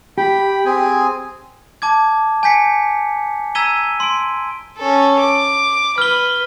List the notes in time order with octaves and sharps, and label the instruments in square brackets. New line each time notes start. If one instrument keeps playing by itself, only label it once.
[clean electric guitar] G4 [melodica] G5 B5
[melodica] C4 G#4 G#5
[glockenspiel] A5 D6 G#6
G#5 G6 B6 C#7
A#5 E6 G#6 B6 D#7 G7
C6 D7
[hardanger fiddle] C#4 A4
D6
[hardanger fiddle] B4 [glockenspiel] F6 G7